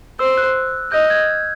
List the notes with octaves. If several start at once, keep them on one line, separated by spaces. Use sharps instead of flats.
C5 E6
F#6
D#5 G6
G#6